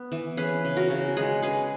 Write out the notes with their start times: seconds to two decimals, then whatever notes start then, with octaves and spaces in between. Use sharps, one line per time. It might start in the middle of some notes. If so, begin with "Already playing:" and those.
Already playing: B3
0.12 E3
0.37 C#4 G#4 B4
0.65 C#3
0.77 F#4 A#4
0.90 C#3
1.17 G#3 G#4 B4
1.42 C#4 G#4 B4